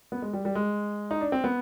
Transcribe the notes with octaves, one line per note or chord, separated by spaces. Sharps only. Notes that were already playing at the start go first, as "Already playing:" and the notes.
B3
G#3
G3
G3
G#3
D#4
D4
C4
B3